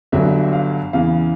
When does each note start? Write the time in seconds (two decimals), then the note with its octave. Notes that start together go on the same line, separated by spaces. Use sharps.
0.12 G1 G2 D3 F#3 E5
0.53 F5
0.93 E2 C#3 E3 F5